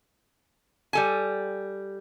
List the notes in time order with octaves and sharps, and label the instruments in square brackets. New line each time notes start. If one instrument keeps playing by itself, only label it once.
[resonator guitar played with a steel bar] G3 A4 G#5